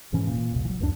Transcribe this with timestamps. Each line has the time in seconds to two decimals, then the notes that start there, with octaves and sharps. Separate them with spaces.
0.12 E1 G#2 E3 C#4
0.27 A#2
0.52 F1 C2
0.65 E3 F#3
0.80 C#2 F#2 F3 D4